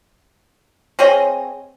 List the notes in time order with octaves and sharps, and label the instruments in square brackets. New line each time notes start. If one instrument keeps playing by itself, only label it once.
[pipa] C4 G#4 C#5 D#5